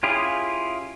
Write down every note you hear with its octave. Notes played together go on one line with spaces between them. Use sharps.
C#4 E4 F4 G4 G#4